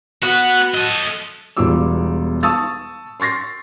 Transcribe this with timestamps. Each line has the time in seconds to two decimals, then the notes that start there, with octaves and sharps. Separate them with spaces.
0.22 B3 F#4 B4
0.74 A4 D#5
1.57 E1 E2 G3 F4 D6 E6
2.43 A5 C#6 D#6 E6 A6
3.20 C6 C#6 A6 A#6 C7